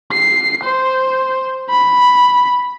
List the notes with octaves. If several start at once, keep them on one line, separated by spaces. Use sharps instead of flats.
C7
C5
B5